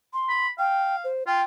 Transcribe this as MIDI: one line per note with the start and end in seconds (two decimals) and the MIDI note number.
0.13 0.46 84
0.29 0.50 83
0.59 1.07 77
0.59 0.96 79
1.04 1.23 72
1.27 1.42 65
1.27 1.44 79